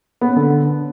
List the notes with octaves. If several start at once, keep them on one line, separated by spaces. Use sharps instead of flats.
B3
C#4
D3